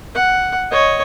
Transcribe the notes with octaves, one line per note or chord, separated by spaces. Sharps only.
F#5
C#5 D#5